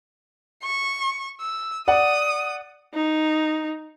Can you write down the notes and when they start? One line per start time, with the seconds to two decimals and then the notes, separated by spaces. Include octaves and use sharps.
0.64 C#6
1.40 E6
1.88 D5 F#5 D#6
2.94 D#4